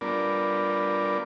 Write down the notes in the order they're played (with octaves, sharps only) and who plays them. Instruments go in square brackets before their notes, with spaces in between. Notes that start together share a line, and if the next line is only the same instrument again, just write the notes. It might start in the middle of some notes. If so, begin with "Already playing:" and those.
[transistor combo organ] G3 B3 D4 F4 A#4 D5